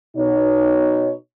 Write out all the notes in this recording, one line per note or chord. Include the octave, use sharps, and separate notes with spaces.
B2 D#4 C#5